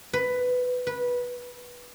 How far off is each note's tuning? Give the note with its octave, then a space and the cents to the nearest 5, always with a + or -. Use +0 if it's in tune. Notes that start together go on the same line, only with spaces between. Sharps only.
B4 +10
B4 -15